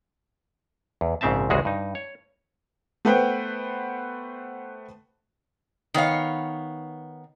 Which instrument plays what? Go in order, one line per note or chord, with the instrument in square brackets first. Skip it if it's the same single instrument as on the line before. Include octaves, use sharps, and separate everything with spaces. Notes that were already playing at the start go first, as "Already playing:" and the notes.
[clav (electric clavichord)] E2
A#1 G#2 C#3 C4 E5 A5
A1 D2 C#3 G#3 F#4 G#4
G2 D#4
C#5
[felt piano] A3 B3 B4 C5 F#5 G5
[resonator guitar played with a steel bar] D#3 B3 C#5 F5